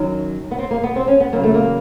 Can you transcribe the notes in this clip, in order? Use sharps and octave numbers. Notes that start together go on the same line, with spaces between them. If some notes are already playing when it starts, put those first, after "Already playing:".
Already playing: F#2 D#3 F#3
B3
C4
A#3
B3
C4
C#4
B3
E2 C#3 F#3 A#3
A3
A#3